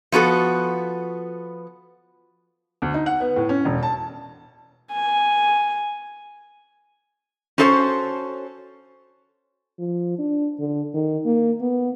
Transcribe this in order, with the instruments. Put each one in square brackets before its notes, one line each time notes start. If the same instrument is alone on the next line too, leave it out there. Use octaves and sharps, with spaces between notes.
[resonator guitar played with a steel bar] F3 B3 F#4 A4
[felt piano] D2
D#4
F#5
B3
A2
C#4
E1
A5
[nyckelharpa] G#5
[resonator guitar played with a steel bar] C#4 F#4 A4 C5 D#5 A5
[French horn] F3
D4
D3
D#3
A#3
B3